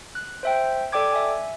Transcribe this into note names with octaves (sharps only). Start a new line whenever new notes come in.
F#6
C5 E5 G5
A4 D5 G5 D6 G#6
E5 G#5